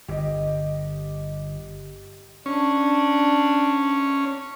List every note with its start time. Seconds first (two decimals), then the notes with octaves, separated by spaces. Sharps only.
0.08 G1 G4 D#5
2.46 C#4 D4